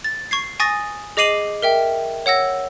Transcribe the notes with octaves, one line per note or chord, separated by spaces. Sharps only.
A6
C#6 G#6 C7
G#5 C#6 D#6 A6 A#6
G#4 D#5 D6 C7 D#7 F#7
A#4 E5 G5
C#5 F#5 E6 A#6